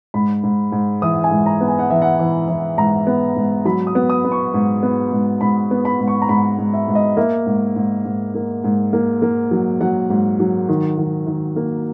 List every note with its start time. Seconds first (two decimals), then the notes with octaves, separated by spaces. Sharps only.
0.14 G#2 B5
0.43 G#2
0.72 G#2
1.02 E3 D#6
1.24 G#5
1.31 G#2
1.46 A#5
1.61 B3
1.68 G#5
1.79 F#5
1.90 E3 E5
2.02 F#5
2.19 E3
2.48 E3
2.78 G#2 A#5
3.07 B3
3.36 G#2
3.65 F#3 B5
3.87 D#6
3.95 B3
4.10 D#6
4.25 B3
4.32 C#6
4.54 G#2
4.83 B3
5.12 G#2
5.41 G#2 B5
5.71 B3
5.85 B5
5.99 G#2
6.08 C#6
6.22 A#5
6.29 G#2 B5
6.58 G#2
6.73 E5
6.88 G#2
6.95 D#5
7.17 A#3 E5
7.46 G#2
7.76 G#2
8.05 G#2
8.35 A#3
8.64 G#2
8.93 A#3
9.22 A#3
9.51 F#3
9.81 F#3 F#5
10.10 G#2
10.40 F#3
10.69 D#3
10.98 D#3
11.27 D#3
11.56 A#3